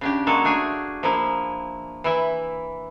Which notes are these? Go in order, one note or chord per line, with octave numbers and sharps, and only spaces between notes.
C#3 D4 G4
G#3 A#3 F#4 A4
A3 D4 G#4 G#5
F3 A#3 E4
E3 E4 E5